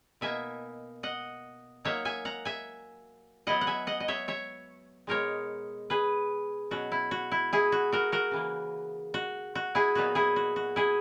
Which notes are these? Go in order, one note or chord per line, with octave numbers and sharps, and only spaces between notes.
B2 A#3 D#4 E5 G#5
D#5 F#5
F#3 A#3 D#4 C#5 E5
E5 G#5
F#5 A#5
E5 G#5
F#3 B3 E4 D#5 F#5
F#5
E5 G#5
D#5 F#5
D#5
C#5 E5
C#5 E5
B2 G#3 D#4 A#4 C#5
G#4 B4
B2 F#3 C#4 F#4
E4
F#4
E4
E4 G#4
F#4
F#4 A#4
F#4 A#4
C#3 E3 A#3
F#4
F#4
E4 G#4
A#2 F#3 B3 D#4 F#4
E4 G#4
F#4
F#4
E4 G#4